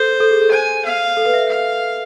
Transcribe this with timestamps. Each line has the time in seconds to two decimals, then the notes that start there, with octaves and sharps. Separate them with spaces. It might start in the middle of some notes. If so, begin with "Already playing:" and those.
Already playing: A4 C5
0.20 A4
0.31 G#4
0.41 A4
0.52 C5 G#5
0.85 F5
1.17 A4
1.26 B4
1.34 E5
1.49 F5